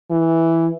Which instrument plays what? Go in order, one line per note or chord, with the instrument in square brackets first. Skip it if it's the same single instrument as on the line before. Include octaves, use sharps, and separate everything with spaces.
[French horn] E3